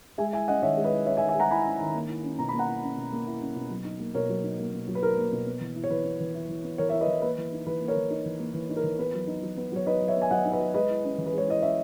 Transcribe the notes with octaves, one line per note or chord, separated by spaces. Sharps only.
G#3 E5 G#5
E4 E5 G#5
C#4 D#5 F#5
D#3 C#5 E5
G#3
B4 D#5
E4
C#4 C#5 E5
E5 G#5
D#3
E5 G#5
G#3 F#5 A#5
E4 G#5 B5
C#4
D#3
A#3
E4
C#4
B2 A#5
A#3 B5
F#5 A#5
E4
C#4
B2
A#3
E4
C#4
B2
F#3
D#4
A#3
B2 A#4 C#5
F#3
D#4
A#3
B2
F#3
B4
D#4 A#4
A#3
B2
B3
E3
E4
C#5
E3 B4
B3
E3
E4
E3
B3
E3 A#4 C#5
C#5 E5
E4
B4 D#5
E3
A#3 B4
E3
D#4
E3 B4
A#3
A#4 C#5
E3
D#4
E3
A#3
E3
D#4
A#4
E3
B3 B4
F#3
D#4
F#3
B3
F#3 C#5
D#4 B4 D#5
F#3
C#5 E5
B3
G#5
F#3 D#5 F#5
D#4
B4 D#5
F#3
G#3 B4 D#5
E4
C#4
E3
B4
G#3 C#5
E4 D#5
C#4 C#5 E5